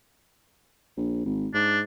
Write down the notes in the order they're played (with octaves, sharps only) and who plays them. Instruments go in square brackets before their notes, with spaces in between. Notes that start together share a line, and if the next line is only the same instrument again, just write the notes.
[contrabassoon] A#1
G#1
[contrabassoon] G#2 [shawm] D4